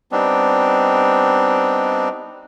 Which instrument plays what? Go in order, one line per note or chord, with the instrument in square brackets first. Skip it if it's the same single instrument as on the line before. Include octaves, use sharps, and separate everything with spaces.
[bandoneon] G3 B3 C4 D4 D#4